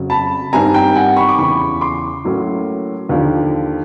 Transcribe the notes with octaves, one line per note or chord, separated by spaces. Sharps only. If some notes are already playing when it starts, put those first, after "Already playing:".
Already playing: F2 C#3 F#3
A5 B5
G2 D#3 G3 C4 G#5 A#5
G5
F#5 G#5
B5 C#6
D6
E2 C#3 E3 B5 C#6
C6 D6
A2 F#3 A#3 C#4
D#2 D3 F3